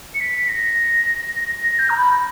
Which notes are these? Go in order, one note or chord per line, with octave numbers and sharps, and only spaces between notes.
C#7
B6
A#6
A#6
G6
A#5
B5